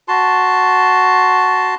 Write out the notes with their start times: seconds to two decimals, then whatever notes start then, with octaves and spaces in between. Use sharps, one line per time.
0.08 F#4 A5 C6